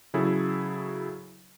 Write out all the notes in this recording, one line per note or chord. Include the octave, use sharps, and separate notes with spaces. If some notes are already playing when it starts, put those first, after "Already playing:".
C#3 F#3 E4 G#4 A4